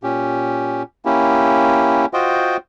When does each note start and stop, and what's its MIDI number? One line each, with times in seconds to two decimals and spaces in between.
0.03 0.83 46
0.03 0.83 61
0.03 0.83 67
1.05 2.06 58
1.05 2.06 61
1.05 2.06 64
1.05 2.06 67
2.13 2.57 65
2.13 2.57 66
2.13 2.57 72
2.13 2.57 75
2.13 2.57 79